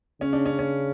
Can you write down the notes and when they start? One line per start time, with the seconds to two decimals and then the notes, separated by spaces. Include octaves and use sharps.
0.21 C#3 C#4
0.33 D4
0.46 C#4
0.59 C#4